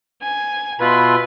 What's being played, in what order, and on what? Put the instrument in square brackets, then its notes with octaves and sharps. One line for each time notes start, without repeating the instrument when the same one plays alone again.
[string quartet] G#5
[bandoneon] B2 F4 B4 [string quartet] E5 B5 C6